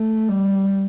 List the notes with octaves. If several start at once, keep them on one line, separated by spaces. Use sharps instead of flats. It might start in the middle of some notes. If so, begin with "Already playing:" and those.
Already playing: A3
G3